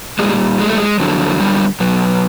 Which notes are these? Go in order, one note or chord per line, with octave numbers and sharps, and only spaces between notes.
A#2 G3 G#3
G#3
A3
G#3
F2 D3 F#3
G3
B2 F#3